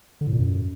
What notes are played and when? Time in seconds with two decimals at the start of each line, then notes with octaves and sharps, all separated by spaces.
0.21 D3
0.27 A2
0.33 A#2
0.39 F#2